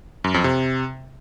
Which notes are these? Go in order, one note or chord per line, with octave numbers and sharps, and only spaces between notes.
F#2
F2
C3